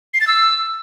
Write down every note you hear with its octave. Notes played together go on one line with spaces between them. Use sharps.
C7
A6
E6